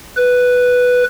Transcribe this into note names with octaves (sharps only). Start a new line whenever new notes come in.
B4